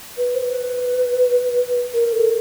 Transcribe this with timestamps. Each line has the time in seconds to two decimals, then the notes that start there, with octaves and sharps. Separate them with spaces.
0.17 B4
0.35 C5
0.42 B4
1.94 A#4
2.13 A4